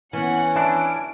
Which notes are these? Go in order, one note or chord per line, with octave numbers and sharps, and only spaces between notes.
E3 B3 C#4 F#5
E3 D4 A5 D7